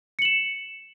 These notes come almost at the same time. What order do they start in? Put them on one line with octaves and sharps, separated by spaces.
C#7 F#7 E7